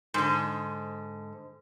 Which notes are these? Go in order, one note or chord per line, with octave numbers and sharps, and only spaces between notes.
G#2 D3